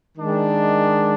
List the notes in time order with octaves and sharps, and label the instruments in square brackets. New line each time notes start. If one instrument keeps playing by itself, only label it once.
[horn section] D#3 G#3 D4